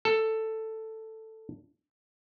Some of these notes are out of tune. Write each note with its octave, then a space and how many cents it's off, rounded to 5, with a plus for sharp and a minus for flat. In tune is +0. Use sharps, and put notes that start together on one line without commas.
A4 +5